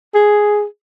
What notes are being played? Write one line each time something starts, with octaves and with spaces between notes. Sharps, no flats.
G#4